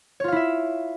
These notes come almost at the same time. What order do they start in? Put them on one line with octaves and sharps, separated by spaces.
C#5 F4 F5 E4 E5